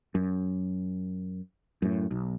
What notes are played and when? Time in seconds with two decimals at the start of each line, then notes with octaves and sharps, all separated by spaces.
0.15 F#2
1.82 F#2 A2
2.11 B1